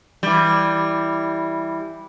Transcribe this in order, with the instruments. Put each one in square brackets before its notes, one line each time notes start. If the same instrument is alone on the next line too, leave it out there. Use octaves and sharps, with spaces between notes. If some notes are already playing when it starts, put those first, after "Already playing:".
[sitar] E3 G3